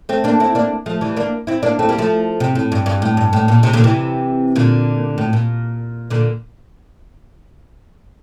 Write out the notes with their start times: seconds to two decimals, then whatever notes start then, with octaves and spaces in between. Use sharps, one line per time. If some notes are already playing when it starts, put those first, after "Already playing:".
0.09 A3 C4
0.24 A#3 D4
0.40 C4 E4
0.55 A#3 D4
0.86 F3 A3
1.01 E3 G3
1.16 A#3 D4
1.47 C4 E4
1.63 A#3 D4
1.79 A3 C4
1.89 G3 A#3
1.98 F3 A3
2.40 C3
2.55 A2
2.72 G2
2.86 G2
3.02 A2
3.17 G2
3.33 A2
3.48 A#2
3.63 C3
3.73 A#2 D3
3.84 C3 E3
4.56 A#2 D3
5.18 A2
5.33 A#2
6.10 A#2 D3